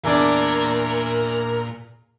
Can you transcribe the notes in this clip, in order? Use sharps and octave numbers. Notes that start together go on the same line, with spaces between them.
E2 A#2 D4 A#4 D5